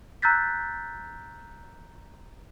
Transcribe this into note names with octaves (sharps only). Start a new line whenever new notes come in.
A#5 E6 F#6 G6 A6 B6